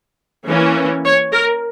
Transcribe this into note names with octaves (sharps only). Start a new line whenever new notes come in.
E3 A#3 C#4
C#5
A#4